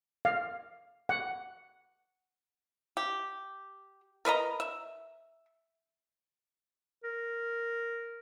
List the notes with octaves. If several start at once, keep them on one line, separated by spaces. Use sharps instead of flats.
F5
F#5
G4
A#4 B4 D#5 A#5
E5
A#4